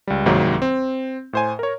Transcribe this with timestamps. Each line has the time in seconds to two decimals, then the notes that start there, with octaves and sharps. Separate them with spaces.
0.07 C#2 G3
0.26 C2 G#2 D#3 F#3 A#3
0.62 C4
1.33 A2 C5 G#5
1.59 A#4 C#5